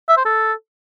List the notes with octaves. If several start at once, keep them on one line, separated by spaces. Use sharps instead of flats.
E5
C5
A4